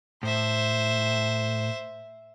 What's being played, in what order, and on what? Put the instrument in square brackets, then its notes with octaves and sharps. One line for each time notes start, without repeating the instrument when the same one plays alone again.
[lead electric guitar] A2 [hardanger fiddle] C5 E5